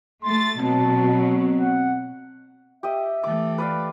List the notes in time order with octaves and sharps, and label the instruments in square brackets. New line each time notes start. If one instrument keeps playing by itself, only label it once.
[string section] A3 A6 [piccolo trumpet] C6
[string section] B2 F#3 [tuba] C4 [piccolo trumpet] A5
[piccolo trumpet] F#5
[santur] G4 D#5 [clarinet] E5
[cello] E3 A3 [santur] D6
[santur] B4 D5 F5